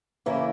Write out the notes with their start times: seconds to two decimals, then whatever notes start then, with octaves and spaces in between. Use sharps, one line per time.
0.26 C#3 E3 A#3 E4 A#4